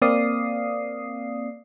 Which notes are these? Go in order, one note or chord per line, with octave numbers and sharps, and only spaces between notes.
A#3 C4 D5 F5 D#6 C7